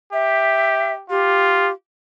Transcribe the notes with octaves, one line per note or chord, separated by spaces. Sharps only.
G4 E5
F4 G4